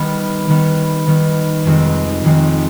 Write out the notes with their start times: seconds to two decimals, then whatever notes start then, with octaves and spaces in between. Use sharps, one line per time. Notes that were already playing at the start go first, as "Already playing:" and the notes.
Already playing: D#3 G3 B3
0.49 D#3 G3 B3
1.07 D#3 G3 B3
1.65 F1 F2 D#3 G#3 C4
2.24 F1 F2 D#3 G#3 C4